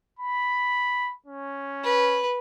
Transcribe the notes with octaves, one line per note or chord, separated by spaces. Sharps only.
B5
C#4
B4